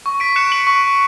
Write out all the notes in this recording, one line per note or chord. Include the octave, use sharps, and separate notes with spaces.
C#6
B6 D7
F#6 C#7 E7
D7 F#7
C#6